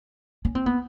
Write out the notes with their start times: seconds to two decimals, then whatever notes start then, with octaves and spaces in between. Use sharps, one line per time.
0.45 C#4
0.55 C4
0.66 B3